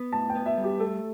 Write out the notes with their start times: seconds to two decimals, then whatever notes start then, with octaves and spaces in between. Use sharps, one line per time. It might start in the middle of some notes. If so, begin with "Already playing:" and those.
Already playing: B3
0.12 A2 A5
0.30 G5
0.35 B3
0.46 E5
0.57 G3
0.64 G4
0.80 A3 A4